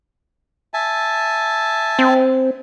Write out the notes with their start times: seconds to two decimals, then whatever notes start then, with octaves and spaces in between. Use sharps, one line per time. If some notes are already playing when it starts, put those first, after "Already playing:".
0.74 E5 G#5 A5
1.99 C4